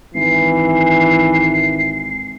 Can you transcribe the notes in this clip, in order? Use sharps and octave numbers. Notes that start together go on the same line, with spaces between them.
G#1 E3 C7